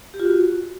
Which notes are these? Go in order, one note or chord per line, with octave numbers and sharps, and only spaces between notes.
G4
F4
F#4